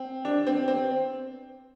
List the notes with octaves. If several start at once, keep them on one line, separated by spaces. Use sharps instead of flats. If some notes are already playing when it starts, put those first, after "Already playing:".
Already playing: C4
D4
C4
C4